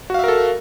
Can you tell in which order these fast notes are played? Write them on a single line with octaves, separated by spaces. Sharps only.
F#4 F5 E5 A#4 A4